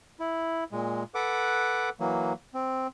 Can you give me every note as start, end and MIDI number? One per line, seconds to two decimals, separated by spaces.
0.20 0.64 64
0.72 1.03 46
0.72 1.03 56
1.15 1.89 69
1.15 1.89 71
1.15 1.89 78
1.15 1.89 86
2.00 2.33 52
2.00 2.33 54
2.00 2.33 58
2.54 2.87 60